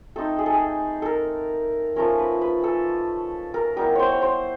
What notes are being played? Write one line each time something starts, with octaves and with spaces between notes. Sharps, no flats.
A3 C4 D#4 A4
G#4
A4
G#4
A4 A#4
F3 A3 C#4 A#4
B4
B4
A4
A#4
G3 B3 E4 A#4
C5 C#5
C#5
C5